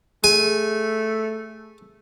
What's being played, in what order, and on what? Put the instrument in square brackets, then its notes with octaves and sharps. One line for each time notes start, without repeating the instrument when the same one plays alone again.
[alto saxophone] A3 [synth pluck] G#4 [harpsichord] G#5